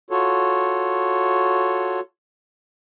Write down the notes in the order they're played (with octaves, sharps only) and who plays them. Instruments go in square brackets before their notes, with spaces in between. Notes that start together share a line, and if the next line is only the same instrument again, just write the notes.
[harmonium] F4 F#4 A4 C#5